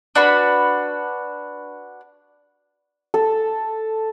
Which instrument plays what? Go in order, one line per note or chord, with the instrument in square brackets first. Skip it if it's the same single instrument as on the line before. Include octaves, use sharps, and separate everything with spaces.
[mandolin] D4 F#4 B4 B5
[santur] A4